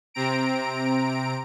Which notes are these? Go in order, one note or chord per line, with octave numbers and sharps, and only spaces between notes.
C3 C4 A#5 D7